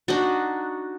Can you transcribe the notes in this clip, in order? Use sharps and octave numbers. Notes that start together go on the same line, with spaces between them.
D4 D#4 F#4